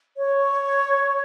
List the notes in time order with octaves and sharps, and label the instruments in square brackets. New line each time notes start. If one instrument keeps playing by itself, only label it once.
[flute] C#5